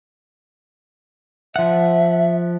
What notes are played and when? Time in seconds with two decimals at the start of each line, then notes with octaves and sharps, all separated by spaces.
1.56 F3 E5 F#5